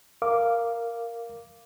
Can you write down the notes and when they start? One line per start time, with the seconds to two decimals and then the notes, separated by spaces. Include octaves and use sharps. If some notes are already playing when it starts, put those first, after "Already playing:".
0.22 A#4 F5 D6